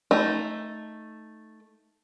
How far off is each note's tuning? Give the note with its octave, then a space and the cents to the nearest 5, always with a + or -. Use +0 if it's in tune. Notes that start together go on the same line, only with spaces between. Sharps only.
A3 +0 D#4 +0